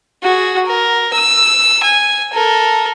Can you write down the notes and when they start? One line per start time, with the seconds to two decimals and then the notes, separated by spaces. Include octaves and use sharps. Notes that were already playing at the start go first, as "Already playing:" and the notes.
0.23 F#4 G#4
0.66 A#4
1.13 E6
1.83 G#5
2.33 A4 A#4